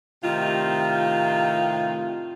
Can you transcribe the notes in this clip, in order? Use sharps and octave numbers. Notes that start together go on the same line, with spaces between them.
A2 C3 D#3 F4